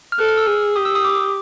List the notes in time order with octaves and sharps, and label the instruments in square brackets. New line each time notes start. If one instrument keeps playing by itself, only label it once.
[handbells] F6
[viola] A4 [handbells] F#6
[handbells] F6
E6
[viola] G#4
[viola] G4 [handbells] D#6
[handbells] E6
D#6
D6